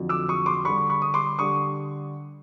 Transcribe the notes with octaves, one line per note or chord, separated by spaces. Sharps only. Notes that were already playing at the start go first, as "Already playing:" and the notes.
Already playing: F2 D3 F#3
D6 E6
C#6 D#6
C6 D6
G2 D3 G3 B5 C#6
B5 C#6
D#6
C6 D6
D3 G3 C#6 D#6